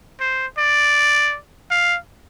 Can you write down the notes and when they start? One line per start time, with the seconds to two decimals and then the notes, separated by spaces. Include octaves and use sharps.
0.20 C5
0.58 D5
1.71 F5